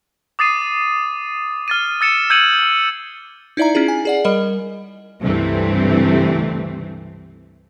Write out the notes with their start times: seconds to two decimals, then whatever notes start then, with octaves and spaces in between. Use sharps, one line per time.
0.39 D6 D#6 A6 C7 D#7
1.68 F6 A6 D#7
2.01 E6 A6 C#7 E7
2.30 E6 G6 G#6 C#7 D#7 F#7
3.57 D#4 E4 D5 E5 A#5
3.75 C#4 E4 F4 G#4
3.88 G#5
4.05 G#4 D5 F#5
4.24 G3 A#4 D#5
5.21 C#2 G2 C3 E3 A3 C4